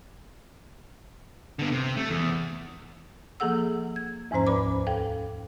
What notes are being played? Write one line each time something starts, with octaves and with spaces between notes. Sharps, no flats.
D3 B3
C3
A3
E2
F3 A#3 G#4 A4 F#5 E6
G#6
E2 G#2 F3 C#4 C5 A#5
D2 B4 B5 D6
A4 F5 G5